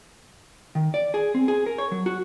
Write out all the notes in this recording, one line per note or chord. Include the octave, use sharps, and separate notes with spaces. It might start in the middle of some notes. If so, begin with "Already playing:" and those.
D#3
D5
G#4
C4
G#4
A#4
C#5
F#3
F#4